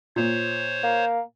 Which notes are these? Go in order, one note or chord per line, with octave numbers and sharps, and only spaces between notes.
A#2 C5 C#5
A#3